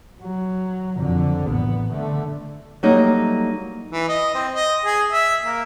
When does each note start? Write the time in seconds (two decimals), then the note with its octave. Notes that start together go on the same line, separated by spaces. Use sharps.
0.23 F#3
0.98 F2 D3
1.49 A1 B3
1.92 D3 A3
2.83 F#3 G3 A3 A#3 D#4
3.91 E3
4.09 D#5
4.35 C4
4.54 D#5
4.85 G#4
5.12 E5
5.43 A#3